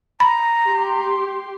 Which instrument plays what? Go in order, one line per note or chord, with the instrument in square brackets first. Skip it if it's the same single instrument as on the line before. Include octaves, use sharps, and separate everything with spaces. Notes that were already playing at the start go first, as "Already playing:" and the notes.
[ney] A#5 [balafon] B5
[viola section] G4 C6